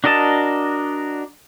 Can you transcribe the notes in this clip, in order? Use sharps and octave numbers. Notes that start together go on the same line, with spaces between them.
D4 F#4 A#4 D#5 A5